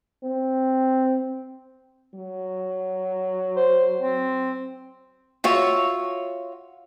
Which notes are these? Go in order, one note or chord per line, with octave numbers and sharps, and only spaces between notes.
C4
F#3
C5
C4
F4 F#4 C#5 E5